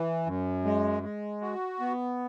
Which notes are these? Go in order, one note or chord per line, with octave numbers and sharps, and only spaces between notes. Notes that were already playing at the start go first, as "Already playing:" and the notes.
Already playing: E3
F#2
G#3
G#3
F#4
B3